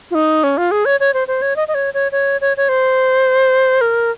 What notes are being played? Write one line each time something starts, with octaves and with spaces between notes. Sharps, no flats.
F4
D#4
C#4
F4
G#4
C#5
C#5
C5
C5
C#5
D#5
D#5
C#5
C#5
C#5
C#5
C#5
C5
A#4